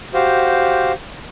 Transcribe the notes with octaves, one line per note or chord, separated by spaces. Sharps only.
F#4 G4 C5 F5